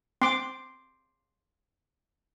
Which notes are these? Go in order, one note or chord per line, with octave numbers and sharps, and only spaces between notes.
C4 C6 D6